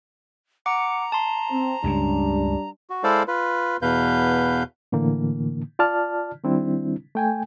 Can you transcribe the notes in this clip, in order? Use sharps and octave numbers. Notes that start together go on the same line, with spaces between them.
F#5 A#5 D6 C#7
A5 C6
C4
C#2 G2 C#3 G3 D4
F#4
G#3 E4 A4 C5 D5 F5
F4 B4
E2 B2 B4 F5 G6
A2 D3 E3 A#3
F4 D5 A5 F6
D#3 G3 C4 D4 E4
A3 G5 G#5